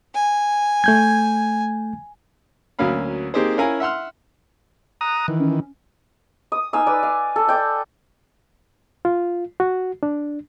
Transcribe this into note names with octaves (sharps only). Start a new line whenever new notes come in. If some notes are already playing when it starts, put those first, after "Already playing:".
G#5
A3 G6 G#6
D2 F#3 A#3 C#4 F5 B5
A#3 C4 D#4 G4 G#4 C5
C#4 E4 A#4 F5 G#5 A#5
E5 F#5 C6 F6
A#5 D#6 F#6
D#3 E3
C#4
D#6
D#4 F5 G#5 E6
B4 D5
F5
A4
D5 G5 A5
F4
F#4
D4